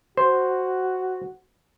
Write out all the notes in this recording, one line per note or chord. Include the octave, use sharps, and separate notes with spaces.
F#4 C5